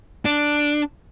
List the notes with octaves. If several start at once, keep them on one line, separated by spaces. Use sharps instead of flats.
D4